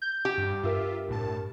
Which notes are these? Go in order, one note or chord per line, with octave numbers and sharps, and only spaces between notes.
G6
G4
G2
G2 F4 A#4 E5
C2 A2 A5